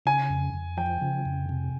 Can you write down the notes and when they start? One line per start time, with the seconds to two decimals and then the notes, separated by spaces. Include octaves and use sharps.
0.06 C#3 G#5
0.30 F2
0.54 F2
0.77 F3 G5
1.02 C#3
1.25 F2
1.49 C3